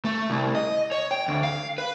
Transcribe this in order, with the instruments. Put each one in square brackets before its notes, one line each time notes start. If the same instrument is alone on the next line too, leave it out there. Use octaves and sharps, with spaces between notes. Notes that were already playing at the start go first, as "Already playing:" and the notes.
[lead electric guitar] A3
C2
D#5
C#5
G5
D2
F5
B4